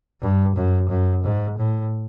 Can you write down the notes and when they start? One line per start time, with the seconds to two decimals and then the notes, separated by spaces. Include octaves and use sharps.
0.22 G2
0.55 F#2
0.89 F#2
1.23 G#2
1.58 A2